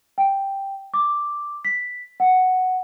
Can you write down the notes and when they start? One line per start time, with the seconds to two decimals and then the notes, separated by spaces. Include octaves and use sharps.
0.18 G5
0.94 D6
1.65 B6
2.20 F#5